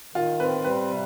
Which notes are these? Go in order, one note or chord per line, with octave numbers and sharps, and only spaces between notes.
D#3 F4
C4 B4
G3 B4
C3